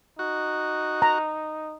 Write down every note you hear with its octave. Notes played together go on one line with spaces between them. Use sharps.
D#4 F#4
A#5